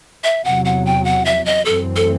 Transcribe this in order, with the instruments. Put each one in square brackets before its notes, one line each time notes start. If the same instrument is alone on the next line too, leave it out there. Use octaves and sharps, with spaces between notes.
[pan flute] E5
[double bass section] E2 C3 F#3 [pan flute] F#5
[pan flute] F#5
G5
F#5
E5
D#5
[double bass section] F#2 E3 A3 C4 [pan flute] A4
[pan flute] A4